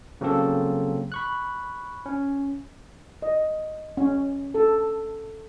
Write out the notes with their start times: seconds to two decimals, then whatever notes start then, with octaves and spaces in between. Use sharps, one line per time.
0.21 C#3 F#3 A#3 C4 A4
1.12 B5 C#6 F#6
2.06 C#4
3.22 D#5
3.97 C#4
4.54 A4